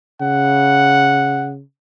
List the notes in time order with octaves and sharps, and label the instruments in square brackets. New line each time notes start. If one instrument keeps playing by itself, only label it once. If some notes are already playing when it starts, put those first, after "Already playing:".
[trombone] C#3 [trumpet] F#5